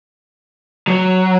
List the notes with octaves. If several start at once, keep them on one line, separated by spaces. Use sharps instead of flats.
F#3